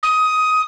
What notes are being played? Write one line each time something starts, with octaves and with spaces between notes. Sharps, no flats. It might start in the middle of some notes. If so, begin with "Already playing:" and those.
D#6